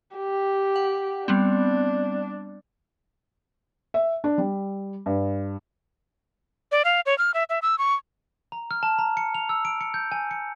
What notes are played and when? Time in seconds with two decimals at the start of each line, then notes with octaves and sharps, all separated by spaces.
0.16 G4
0.76 F#5
1.28 G3 B3 C4 D4
3.94 E5
4.24 D4
4.38 G3
5.06 G2
6.72 D5
6.85 F5
7.06 C#5
7.18 F6
7.34 E5
7.50 E5
7.62 E6
7.78 C#6
8.52 A#5
8.71 F6
8.83 A5
8.98 A#5
9.17 C#7
9.35 F7
9.49 E6
9.65 D7
9.81 C#7
9.94 G6
10.12 G#5
10.31 C#7